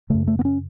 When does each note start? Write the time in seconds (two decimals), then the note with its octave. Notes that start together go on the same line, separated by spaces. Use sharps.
0.10 F#2 C#3 A3
0.28 A3
0.39 B3
0.45 C#4